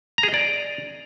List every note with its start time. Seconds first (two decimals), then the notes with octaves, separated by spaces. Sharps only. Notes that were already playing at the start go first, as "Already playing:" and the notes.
0.18 A#5
0.23 G#4
0.29 D#5
0.34 D5